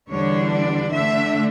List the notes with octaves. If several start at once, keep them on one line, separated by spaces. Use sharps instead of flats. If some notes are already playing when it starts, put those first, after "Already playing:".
E2 D3 G3 D4 C#5
D5
D3 A3 D4 E5